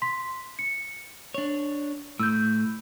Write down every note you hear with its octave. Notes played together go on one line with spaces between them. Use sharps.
C6 B6
C#7
D4 C#5
A2 E6 G6